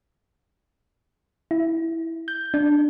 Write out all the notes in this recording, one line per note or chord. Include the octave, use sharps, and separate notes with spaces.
E4
G6
D4